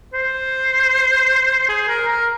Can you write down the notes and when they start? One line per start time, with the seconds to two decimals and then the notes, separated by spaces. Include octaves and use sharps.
0.13 C5
1.69 G#4
1.88 A#4
2.07 A#4